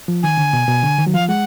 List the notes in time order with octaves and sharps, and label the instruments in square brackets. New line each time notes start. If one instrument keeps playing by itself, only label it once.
[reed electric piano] F3
[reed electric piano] D#3 [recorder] G#5
[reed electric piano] D3
B2
B2
D3
D#3
F#3
[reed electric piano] F3 [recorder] F5
[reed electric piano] G#3 [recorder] F#5